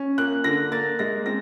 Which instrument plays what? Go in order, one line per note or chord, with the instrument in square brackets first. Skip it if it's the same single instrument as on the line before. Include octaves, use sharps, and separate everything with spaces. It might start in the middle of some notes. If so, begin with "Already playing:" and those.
Already playing: [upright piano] C#4
A#3 F#6
D3 A#6
A#3 A6
G#3 A#6
C4 A#6